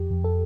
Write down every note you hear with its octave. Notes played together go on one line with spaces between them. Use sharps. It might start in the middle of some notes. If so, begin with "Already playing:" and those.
Already playing: F2 G4
F2
A4